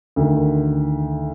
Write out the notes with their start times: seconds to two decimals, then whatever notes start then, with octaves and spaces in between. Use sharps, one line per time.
0.16 D2 D#3